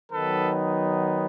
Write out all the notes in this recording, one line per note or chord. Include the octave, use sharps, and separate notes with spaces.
D#3 F#3 B3 D#4 A4 B4